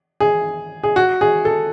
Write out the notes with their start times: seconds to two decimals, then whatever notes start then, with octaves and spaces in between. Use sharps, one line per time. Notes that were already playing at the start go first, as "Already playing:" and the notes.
0.20 G#4
0.83 G#4
0.96 F#4
1.21 G#4
1.45 A4